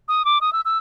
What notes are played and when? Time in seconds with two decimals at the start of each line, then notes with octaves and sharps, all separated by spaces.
0.08 D#6
0.25 D6
0.41 D#6
0.53 E6
0.65 E6